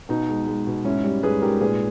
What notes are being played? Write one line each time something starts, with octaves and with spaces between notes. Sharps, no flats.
B2 D#4
G#3
G#3
B2
G#2 C#4 E4
G3
G#2 G#4 B4
G#2 G4 A#4
A#2 G#4 B4